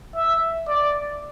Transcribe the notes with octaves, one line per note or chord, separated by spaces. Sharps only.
E5
D5